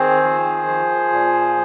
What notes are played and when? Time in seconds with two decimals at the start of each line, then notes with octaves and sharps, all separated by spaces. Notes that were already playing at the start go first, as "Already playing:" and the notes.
Already playing: D#3 C4 G#4 C5
0.23 F3
0.67 F3
1.12 A#2